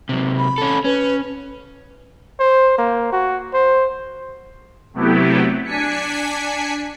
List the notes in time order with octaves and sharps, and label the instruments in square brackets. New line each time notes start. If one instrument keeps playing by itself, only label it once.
[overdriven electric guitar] C3 F#3
[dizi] B5
[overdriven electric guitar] C#4 A4
[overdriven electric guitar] C#4 [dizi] B4
[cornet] C5
A#3
F#4
C5
[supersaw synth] C3 F#3 A3 B3 E4 G4
D4 G#5 B6 C#7